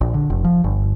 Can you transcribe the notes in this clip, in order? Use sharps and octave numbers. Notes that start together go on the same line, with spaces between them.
A#1
D3
F1
F3
G1